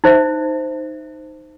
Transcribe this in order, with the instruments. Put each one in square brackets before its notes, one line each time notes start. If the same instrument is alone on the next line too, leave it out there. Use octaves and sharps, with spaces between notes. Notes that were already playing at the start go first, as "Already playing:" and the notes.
[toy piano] D#4 C5 E5